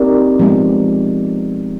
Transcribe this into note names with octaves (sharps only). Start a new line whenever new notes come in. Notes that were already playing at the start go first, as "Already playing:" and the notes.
Already playing: C4 D#4 G4 A#4 D5
F3 G#3 B3